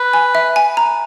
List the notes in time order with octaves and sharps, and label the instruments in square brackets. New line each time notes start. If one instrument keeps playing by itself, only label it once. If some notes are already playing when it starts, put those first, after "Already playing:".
Already playing: [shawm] B4
[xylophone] G#5
E5
G#5
A#5